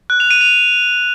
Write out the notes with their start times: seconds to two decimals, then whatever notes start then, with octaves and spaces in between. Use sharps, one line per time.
0.10 F#6
0.20 F7
0.31 D#7
0.41 F7